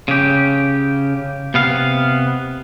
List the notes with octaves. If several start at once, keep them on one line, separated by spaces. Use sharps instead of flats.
C#3 G4
C3 B3 F5